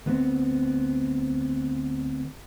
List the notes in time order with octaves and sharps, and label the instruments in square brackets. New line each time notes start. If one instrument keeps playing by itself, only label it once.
[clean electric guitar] D2 B3 C4